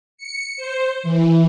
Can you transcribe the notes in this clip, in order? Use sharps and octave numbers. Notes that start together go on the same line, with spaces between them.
C#7
C5
E3